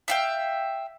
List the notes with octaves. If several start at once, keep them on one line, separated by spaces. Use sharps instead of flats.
E5 F5 G5